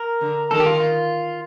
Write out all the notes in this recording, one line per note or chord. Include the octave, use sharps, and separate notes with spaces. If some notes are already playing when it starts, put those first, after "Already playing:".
Already playing: A#4
D3
D#3 A4
G4
F4
F4